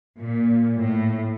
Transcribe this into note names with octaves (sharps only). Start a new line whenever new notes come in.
A#2
A2